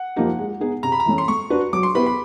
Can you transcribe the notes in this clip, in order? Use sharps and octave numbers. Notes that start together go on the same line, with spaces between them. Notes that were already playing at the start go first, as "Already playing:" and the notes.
Already playing: F#5
F3 A#3 D#4 G4
G#3
B3 D#4 G#4
C3 A#5
B5
A#5
E3 A3 C#4
C6
A3 C#6
D4 F#4 B4
F#3 D6
C6
B3 E4 G4 B4 B5
B5